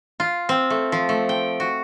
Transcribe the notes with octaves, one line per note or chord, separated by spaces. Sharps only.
F4
C4
A3
F3
A3
G5
F#4